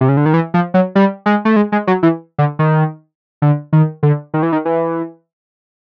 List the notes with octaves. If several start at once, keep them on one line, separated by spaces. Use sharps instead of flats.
C3
C#3
D3
D#3
E3
F3
F#3
G3
G#3
A3
G#3
G#3
F#3
E3
D3
D#3
D3
D#3
D3
D#3
E3
D#3
E3